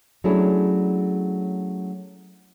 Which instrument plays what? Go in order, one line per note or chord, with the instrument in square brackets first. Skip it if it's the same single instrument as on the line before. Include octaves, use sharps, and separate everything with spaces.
[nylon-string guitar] F#3 A3 C#4 D4 E4 G#4